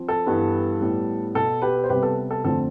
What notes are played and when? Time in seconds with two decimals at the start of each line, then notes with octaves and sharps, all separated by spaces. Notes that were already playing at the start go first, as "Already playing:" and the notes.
Already playing: F3 C4
0.08 A4
0.26 G2 E3 G3 B3
0.81 A2 G3 B3
1.34 B2 B3 A4
1.62 G4 B4
1.84 C5
1.89 C3 G3 B3 G4 B4
2.03 A4
2.31 A4
2.44 F2 D3 F3 A3 C4 A4